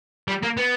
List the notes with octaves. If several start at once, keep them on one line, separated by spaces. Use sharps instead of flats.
G3
A#3
B3